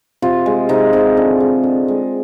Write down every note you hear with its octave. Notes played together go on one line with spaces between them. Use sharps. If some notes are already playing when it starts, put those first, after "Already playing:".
C3 F4
G#3
C3 D#4
C3
D3
G#3
D3
G#3